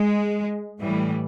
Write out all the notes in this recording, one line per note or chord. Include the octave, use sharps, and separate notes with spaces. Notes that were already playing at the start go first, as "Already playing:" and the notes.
Already playing: G#3
A2 E3 G3